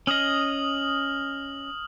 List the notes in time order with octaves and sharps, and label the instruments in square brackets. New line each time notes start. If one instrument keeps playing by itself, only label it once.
[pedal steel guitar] C#4 D#5 [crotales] D#6 F6 F#7